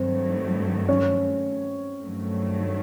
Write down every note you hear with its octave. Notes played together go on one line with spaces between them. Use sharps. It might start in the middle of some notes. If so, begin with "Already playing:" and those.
Already playing: G2 D#3 F#3 A3 C4 C5
C#4 C#5
G2 D#3 F#3 A3